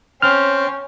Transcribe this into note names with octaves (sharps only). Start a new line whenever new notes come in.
C4 C#4 F6